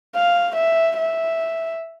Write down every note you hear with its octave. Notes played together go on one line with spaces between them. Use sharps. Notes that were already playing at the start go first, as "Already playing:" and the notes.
F5
E5
E5